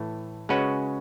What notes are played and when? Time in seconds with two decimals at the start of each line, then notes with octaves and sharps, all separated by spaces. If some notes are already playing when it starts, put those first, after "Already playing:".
Already playing: A2 E3 A3
0.49 C#3 G#3 C#4 F#4 B4